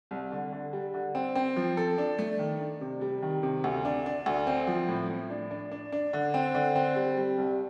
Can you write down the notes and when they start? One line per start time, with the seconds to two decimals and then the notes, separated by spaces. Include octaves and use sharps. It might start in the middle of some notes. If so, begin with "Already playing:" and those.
0.11 C2
0.32 D3
0.53 D3
0.73 G3
0.94 D3
1.15 C4
1.35 C4
1.57 F3
1.77 A4
1.98 D4
2.19 A3
2.39 D#3
2.60 D4
2.81 C3
3.01 G3
3.22 D#3
3.43 C3
3.64 D2
3.85 D4
4.06 D4
4.26 D2
4.47 C4
4.67 F3
4.88 A2
5.09 A2
5.30 D4
5.51 D4
5.71 D4
5.92 D4
6.13 D3
6.34 C4
6.54 D3
6.76 C4
6.96 G3
7.17 G3
7.38 C2